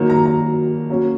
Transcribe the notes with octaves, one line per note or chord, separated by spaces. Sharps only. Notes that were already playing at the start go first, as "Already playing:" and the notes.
Already playing: D#3 F#3 A#3
A#5
A#5
F#3 A#3 C#4